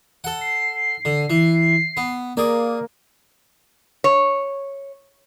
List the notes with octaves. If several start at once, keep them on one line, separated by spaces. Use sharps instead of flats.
A4 F#5
C7
D3
E3
B3
A#3 G#4 D5
C#5